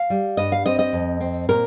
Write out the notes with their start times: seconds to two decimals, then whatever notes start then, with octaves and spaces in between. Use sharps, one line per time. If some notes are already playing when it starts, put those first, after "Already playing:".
Already playing: F5
0.10 G3
0.37 G2 D#5
0.52 F5
0.66 C4 D#5
0.79 D#5
0.93 F2
1.20 C4
1.49 A#2 A#4